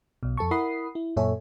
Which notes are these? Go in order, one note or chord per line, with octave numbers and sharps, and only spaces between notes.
B1 B2
F2 A4 A5 C#6
E4 A#4 F#5 B5 D#6 C7
E4
F#2 A#2 A4 C#5 E5 G#5